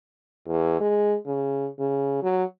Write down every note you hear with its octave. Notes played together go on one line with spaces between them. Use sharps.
E2
G#3
C#3
C#3
F#3